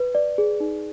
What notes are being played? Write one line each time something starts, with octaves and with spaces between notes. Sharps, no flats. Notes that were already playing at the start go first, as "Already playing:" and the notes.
Already playing: B4
D5
G#4
D#4